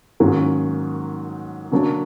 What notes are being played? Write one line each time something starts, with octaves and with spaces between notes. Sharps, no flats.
G#2 D#3 F#3 A#3 C#4
D3 F#3 A#3 D4